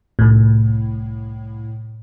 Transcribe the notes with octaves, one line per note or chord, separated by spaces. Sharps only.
C2 A2